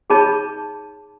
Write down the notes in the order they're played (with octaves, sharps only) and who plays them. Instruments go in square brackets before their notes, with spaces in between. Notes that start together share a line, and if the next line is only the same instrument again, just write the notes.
[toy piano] D#4 G#4 C#5 A5 B5